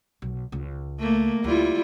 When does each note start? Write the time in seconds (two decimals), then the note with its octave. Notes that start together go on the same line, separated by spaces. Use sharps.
0.22 B1
0.52 C#2
0.99 A3 A#3
1.44 D2 G3 E4 F4